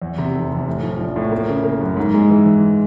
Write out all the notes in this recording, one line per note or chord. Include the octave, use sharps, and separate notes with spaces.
E2
C3
F1
F1
A2
F3
A#1
A2
A#3
C#3
A#3
F#2
G#2
G#3
E3
E3